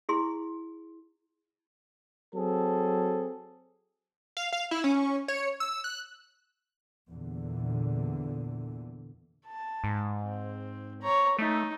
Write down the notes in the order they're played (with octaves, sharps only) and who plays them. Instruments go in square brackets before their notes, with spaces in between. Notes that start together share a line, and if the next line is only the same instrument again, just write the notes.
[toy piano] E4 G#4 C6
[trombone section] F#3 C4 G#4 A4
[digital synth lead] F5
F5
E4
C#4
C#5
E6
F#6
[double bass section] E2 A#2 D3
[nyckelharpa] A5
[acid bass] G#2
[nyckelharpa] C4
C#5 A#5
[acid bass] A3 [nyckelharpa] D#4